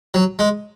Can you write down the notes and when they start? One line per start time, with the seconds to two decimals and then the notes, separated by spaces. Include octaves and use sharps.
0.14 F#3
0.39 G#3